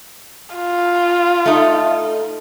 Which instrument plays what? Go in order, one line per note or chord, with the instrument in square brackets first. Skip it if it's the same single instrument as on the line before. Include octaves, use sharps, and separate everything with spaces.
[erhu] F4
[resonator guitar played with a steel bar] A3 D#4